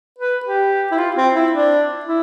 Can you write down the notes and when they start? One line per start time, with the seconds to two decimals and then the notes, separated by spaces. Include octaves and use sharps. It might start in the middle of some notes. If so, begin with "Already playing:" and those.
0.18 B4
0.45 G4
0.91 E4
0.98 F4
1.16 C4
1.34 E4
1.52 D4
2.05 E4